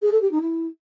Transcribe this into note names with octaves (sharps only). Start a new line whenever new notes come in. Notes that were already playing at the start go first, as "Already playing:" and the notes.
G#4
A4
G4
D#4
E4